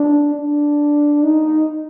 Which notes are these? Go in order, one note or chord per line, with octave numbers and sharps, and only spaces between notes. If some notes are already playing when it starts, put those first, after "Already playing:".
Already playing: D4
D4
D#4